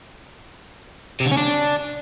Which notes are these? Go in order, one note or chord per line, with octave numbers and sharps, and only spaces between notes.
C3
D3
C#4
D4